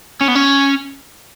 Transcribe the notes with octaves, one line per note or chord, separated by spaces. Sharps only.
C#4
B3
C#4